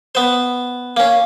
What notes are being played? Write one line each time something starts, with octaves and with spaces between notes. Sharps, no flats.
B3 C5
A#3 C#4